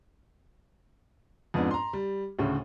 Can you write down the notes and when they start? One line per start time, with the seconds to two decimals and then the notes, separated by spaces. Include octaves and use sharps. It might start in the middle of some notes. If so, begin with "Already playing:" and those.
1.54 F2 G#2 B3 D4
1.71 A#5 C6
1.93 G3
2.39 D2 A2 C#3